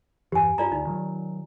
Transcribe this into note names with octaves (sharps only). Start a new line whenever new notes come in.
E2 G2 E3 G4 G#5
G2 F4 D5 A#5
D2 D#4
D#3 F#3